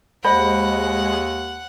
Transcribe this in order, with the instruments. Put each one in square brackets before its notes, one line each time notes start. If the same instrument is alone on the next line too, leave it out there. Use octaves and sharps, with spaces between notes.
[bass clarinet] D#2 [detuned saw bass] G#3 [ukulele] C5 D#5 B5 [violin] F#5